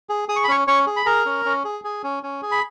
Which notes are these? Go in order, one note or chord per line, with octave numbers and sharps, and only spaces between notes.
G#4
G#4 D#6
C#6
B5
C#4 C#5 C#6
C#4 C#5 C#6
G#4
B5
G#4 A#4 A#5
C#4
C#4
G#4
G#4
C#4
C#4
G#4
B5